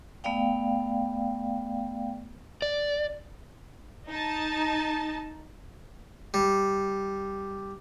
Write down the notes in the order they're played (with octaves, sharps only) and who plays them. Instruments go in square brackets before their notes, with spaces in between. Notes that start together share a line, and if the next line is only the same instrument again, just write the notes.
[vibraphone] A3 B3 D5 F5 G5
[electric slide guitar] D5
[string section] D#4 A5
[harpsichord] G3